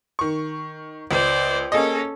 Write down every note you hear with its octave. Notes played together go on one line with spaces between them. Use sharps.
D#3 C#6
C#2 C5 D5
A#3 C#4 G#4 A4 D#5